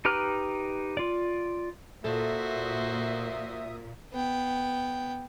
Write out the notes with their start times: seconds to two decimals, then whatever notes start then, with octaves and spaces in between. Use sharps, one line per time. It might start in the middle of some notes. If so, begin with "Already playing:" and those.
0.05 D#4 G4 B4 A#5 F6
0.97 F4 D5
2.04 A#2 F#4 A4 C5 E5 D#6
4.13 B3 G5